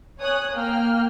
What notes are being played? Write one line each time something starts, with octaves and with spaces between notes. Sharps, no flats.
C#5 G#5 D#6 F#6
A#3 G5 F6